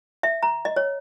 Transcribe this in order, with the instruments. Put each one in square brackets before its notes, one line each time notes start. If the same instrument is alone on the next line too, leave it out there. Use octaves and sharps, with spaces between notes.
[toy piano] E5
A#5
D#5
C#5